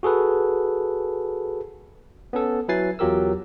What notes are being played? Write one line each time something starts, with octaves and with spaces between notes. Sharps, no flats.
F#4 G#4 A4 B4
B3 C#4 A4
F#3 E4 B4 G#5 A6 C7
E2 F#3 F4 G4 A#4 E6